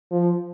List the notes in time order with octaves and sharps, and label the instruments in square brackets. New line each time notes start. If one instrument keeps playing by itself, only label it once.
[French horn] F3